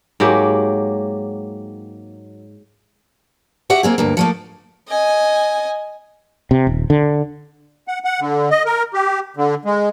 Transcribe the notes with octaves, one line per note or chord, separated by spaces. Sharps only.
G#2 F#3 A#3 G4
F#4 G4 E5 F#5
A#3 C4 G#4
D2 G2 A#3
F3 A3 A#3
D#5 G#5
C3
D#1
D3
F#5
F#5
D3
D#5
A#4
G4
D3
G#3